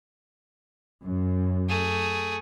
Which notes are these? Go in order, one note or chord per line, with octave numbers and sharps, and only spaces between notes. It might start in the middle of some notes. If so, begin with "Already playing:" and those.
F#2
A3 G#4